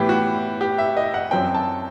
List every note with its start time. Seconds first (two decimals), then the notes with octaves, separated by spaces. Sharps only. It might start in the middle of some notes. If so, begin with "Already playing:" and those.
Already playing: A2 E3 B3 G4
0.09 F#4
0.61 G4
0.78 E5
0.97 D#5
1.14 F#5
1.31 F#2 F#3 C4 G5
1.55 A5